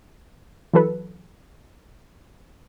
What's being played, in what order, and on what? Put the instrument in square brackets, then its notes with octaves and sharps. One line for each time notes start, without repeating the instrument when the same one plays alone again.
[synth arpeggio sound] E3 F#3 A4 B4